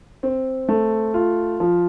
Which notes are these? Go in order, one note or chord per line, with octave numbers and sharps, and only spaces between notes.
C4
A3
F4
F3